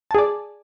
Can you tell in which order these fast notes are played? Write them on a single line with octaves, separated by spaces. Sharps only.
A5 G#4 D5